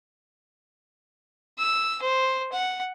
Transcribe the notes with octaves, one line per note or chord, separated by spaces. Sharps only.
E6
C5
F#5